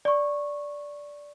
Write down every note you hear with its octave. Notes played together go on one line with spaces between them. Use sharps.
D5 C#6